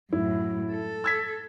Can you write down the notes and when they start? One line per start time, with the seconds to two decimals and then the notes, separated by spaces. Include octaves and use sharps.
0.13 F#2 A2 E4
0.72 A4
1.04 E6 G#6 B6